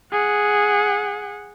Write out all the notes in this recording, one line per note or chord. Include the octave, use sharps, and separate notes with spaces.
G#4 F#5